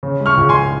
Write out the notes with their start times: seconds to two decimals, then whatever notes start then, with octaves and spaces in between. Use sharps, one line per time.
0.03 C#3
0.21 G#3
0.26 C#6 F6
0.37 C#2
0.49 G#5 C6